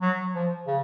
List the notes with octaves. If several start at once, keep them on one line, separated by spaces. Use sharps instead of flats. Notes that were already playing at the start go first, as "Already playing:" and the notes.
F#3
F3
C#3